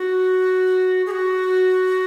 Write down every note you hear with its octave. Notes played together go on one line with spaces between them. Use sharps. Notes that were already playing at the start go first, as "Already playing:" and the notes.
Already playing: F#4
G#4
F#4